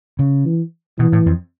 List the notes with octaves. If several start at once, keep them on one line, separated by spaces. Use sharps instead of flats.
C#3
E3
B2 E3
A2
F2